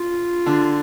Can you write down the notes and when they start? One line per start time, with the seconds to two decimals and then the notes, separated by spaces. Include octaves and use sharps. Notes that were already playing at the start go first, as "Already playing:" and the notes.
Already playing: F4
0.46 D3 D4